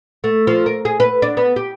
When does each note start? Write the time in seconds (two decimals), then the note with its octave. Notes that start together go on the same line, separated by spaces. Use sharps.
0.24 A3
0.47 F3
0.66 A#4
0.85 G#4
1.00 B4
1.22 D4
1.37 B3
1.56 G4